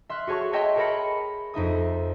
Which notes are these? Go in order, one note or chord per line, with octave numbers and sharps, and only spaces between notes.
E5 C6 F6 F#6
F#4 G#4 C#5 A5 C#6
C#5 D#5 E5 G5 A5 C6
G#4 A#4 A5 B5 A#6 C#7
F2 D#4 E5 D#6